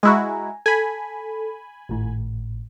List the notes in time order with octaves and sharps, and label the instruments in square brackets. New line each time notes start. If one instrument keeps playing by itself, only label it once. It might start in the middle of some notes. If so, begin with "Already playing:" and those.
[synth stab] G#3 E4 F#4 [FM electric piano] G#5 A#5
[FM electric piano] A4 [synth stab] G#5 B5
[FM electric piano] G#1 A2